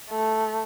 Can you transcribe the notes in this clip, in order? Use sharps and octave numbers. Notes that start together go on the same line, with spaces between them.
A3